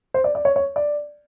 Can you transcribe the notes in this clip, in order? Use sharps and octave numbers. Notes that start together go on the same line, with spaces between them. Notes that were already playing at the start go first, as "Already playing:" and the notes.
C5
D5
D5
C#5
C#5
D5